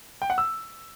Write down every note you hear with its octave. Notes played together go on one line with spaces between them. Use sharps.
G5
F#5
E6